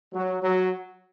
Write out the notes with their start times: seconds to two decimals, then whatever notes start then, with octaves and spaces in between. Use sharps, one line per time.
0.14 F#3
0.43 F#3